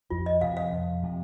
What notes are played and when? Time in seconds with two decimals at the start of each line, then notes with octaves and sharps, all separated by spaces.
0.10 F2 F4
0.26 D#5
0.41 C3 F3 F5
0.57 F5
0.72 F2
1.03 C3 F3